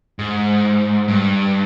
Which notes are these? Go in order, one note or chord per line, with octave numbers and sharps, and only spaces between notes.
G#2
G2